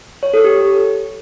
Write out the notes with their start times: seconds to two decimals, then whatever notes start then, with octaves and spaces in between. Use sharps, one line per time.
0.23 C#5
0.34 A4
0.44 G4